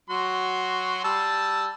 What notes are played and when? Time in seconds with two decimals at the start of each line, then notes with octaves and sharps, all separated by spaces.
0.10 F#3 F#4 C6
1.04 G3 A5 E6